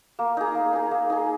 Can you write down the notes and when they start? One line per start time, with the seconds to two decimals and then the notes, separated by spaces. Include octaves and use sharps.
0.19 A#3
0.37 D#4 G#4
0.55 A#3
0.73 D#4 G#4
0.91 A#3
1.10 D#4 G#4